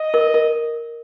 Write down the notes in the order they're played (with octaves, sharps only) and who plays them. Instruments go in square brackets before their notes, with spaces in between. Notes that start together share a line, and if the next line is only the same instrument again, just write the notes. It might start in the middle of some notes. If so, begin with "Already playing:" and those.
Already playing: [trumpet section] D#5
[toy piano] A#4
A#4